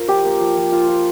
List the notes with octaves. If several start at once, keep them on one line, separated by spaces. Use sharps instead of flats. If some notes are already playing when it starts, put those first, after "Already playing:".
Already playing: F4 A#4 C5
F3 G4
A#3
F3
F3
F4
F4